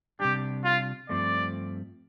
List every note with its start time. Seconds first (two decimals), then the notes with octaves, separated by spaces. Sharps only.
0.20 C3 G3 D4 G4
0.64 F4
1.09 G2 F3 A3 C4 D5